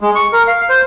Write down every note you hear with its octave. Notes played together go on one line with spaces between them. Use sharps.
G#3
C#6
A#4
F5
C5